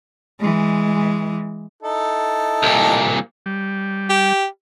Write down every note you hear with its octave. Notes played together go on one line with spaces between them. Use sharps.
E3 G#3
D#4 E4 A4
C2 A#2
G3
G4